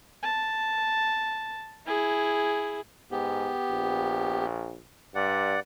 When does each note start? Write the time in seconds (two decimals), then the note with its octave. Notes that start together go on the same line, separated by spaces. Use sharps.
0.23 A5
1.86 E4 G#4
3.11 G#2 B3 G4
3.71 A#1
5.15 G2 D5 F#5